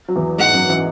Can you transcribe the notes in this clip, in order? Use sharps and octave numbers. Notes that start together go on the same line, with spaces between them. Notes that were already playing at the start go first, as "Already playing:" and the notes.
F#3
E2 E3
G#2 G#3 F#5
F#2 F#3
E3